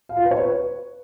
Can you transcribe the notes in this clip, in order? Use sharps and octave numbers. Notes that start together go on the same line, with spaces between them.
F5
F4
B4
C#5
B4